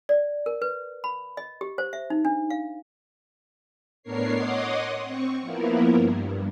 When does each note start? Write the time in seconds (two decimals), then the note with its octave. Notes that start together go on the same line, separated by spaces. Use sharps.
0.09 D5
0.46 A#4
0.62 B4
1.04 B5
1.37 D#5
1.61 G4
1.78 C5
1.93 E5
2.10 D#4
2.25 D4
2.50 F5
4.03 A2 B3 D4 A#4 C#5 C7
4.32 C#5 D#5 F#5 C6 D6 D#6
5.01 C4 C#6
5.41 F3 A#3 B3 E4 A#4
5.93 G2